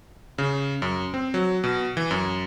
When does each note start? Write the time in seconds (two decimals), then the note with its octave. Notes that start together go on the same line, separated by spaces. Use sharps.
0.38 C#3
0.82 F#2
1.14 C4
1.34 F#3
1.64 B2
1.97 E3
2.11 F#2